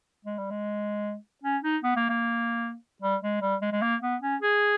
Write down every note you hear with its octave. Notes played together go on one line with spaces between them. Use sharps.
G#3
G3
G#3
C#4
D#4
B3
A#3
A#3
G3
G#3
G3
G#3
G#3
A#3
B3
C#4
G#4